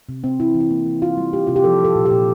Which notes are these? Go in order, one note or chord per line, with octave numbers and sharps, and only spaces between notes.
C3
C3 C4
E3 E4
E3
E4
A#3
E3
A#3 F4
G3
G3 G4
C3 F4
G4
F3 A4
F3 A4
A#2
G4
A#2